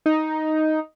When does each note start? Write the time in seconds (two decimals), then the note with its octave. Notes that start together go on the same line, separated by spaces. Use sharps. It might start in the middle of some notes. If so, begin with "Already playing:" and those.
0.06 D#4